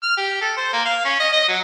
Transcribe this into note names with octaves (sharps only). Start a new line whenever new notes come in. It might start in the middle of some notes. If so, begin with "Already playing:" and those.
F6
G4
A4
C5
A#3
F5
C#4
D#5
D#5
F#3